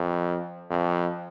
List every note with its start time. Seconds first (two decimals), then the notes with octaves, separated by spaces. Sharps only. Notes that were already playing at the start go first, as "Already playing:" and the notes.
Already playing: F2
0.70 F2